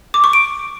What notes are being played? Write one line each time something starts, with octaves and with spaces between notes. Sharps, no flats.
D6
C#6
D7